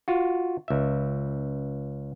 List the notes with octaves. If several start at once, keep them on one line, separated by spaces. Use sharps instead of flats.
F4 F#4
C#2 E5